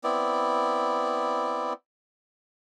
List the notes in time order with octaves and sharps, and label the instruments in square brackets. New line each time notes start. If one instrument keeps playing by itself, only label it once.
[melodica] B3 C4 E4 D5